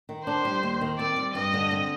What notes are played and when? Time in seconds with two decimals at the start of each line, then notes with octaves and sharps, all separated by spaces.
0.09 D#3
0.26 D4 C5
0.45 G3
0.63 D#2
0.81 D#3
0.98 C4 D5
1.16 G3
1.34 G2 D#5
1.54 D3
1.71 C4